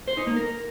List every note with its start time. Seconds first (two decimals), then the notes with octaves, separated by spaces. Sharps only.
0.08 C5
0.17 D#4
0.27 A#3
0.36 A#4